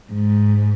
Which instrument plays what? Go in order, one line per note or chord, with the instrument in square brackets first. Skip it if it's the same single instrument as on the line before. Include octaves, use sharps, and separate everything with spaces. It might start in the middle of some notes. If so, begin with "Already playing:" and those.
[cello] G#2